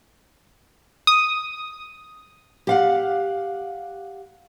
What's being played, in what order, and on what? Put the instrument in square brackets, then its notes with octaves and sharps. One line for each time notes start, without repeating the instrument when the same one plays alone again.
[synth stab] D#6
[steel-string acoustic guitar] G4 F5 F#5